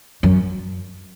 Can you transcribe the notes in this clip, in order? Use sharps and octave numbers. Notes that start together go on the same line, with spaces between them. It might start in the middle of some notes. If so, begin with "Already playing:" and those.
F#2